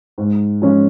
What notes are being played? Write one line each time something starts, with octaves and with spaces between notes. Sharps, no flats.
G#2
F3 G#3 C#4